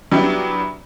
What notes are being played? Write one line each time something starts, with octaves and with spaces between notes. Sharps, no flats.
F#3 G3 B3 D4 E4